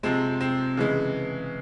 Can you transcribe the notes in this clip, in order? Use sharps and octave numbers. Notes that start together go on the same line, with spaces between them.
C3 F3 G#3 C4
C4
C#3 E3 G#3